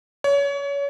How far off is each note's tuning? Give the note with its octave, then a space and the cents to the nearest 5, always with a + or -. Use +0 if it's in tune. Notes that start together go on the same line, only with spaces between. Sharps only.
C#5 +30